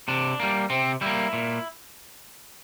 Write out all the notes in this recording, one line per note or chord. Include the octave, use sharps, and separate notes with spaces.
C3 D4
G3 A#3
C3 C4
G3 A#3 E4
A#2